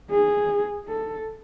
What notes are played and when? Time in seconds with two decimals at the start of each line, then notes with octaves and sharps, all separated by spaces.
0.10 G#4
0.88 A4